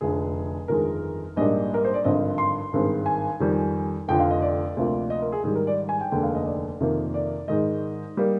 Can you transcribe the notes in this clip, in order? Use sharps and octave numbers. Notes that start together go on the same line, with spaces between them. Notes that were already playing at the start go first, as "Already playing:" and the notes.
F1 F2 D3 G#4
G1 F2 D#3 G#3 A#4
A#1 G#2 G3 A#3 D4 D#5
A#4
C5
D5
G#1 G2 D3 F3 C4 D#5
C6
G#1 G2 D#3 G#3 C4
G#5
F2 D#3 G3
F1 F2 D3 F3 G5
F5
D#5
D5
D2 C3 F3 A#3
D#5
A#4
G#4
G#2 D#3 G3 G#4
A#4
D5
G#5
G5
F1 D#2 D3 G#3 D#4 G5
F5
D#5
D5
F2 C3 D#3 A#3
D5
G#2 D#3 G#3 D#5
G3 A#3